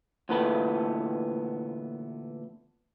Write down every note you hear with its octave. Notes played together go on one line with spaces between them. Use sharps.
D2 A#2 E3 B3 A4 B5